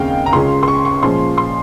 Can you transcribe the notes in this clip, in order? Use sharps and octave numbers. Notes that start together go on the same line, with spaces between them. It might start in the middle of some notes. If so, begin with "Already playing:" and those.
Already playing: D#2 C#3 G#3 C4 F5 G5
A#5
C#2 C#3 G#3 C#4 C6
C6
C#6
C#6
A#2 F3 G#3 C#4 C6
C6